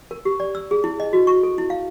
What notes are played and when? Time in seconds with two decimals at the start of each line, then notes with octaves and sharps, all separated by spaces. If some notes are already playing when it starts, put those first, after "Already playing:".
0.11 A#4
0.25 G4
0.40 D5
0.55 E6
0.71 G#4
0.84 E4
1.00 D#5
1.13 F#4
1.27 C#6
1.43 A4
1.58 E4
1.70 F5